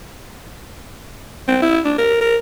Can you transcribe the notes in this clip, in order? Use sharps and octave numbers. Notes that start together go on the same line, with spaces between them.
C4
E4
D4
A#4
A#4